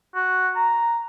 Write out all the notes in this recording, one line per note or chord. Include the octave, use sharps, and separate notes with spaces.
F#4
A#5